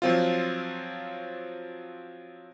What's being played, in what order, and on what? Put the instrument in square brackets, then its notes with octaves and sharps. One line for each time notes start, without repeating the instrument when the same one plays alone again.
[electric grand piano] F3 F#3 C4 F4